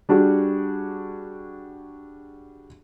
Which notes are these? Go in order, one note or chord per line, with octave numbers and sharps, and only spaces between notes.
G3 D4 F#4 G#4